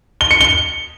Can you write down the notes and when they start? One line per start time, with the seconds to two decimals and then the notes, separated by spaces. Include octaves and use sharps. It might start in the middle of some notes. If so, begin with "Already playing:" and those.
0.21 G7
0.31 C#7
0.41 G7